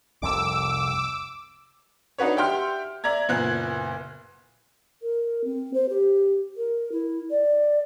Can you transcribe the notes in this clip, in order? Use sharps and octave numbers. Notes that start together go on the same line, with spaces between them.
F1 C2 F2 D6 E6
D4 D#4 F#4 B4 C#5
G4 E5 F#5 G5 C6 F6
D5 E5 A#5 G#6
F#1 A#2 B3 F#6 G#6 F#7
A#4
C4
C5
G4
A#4
E4
D5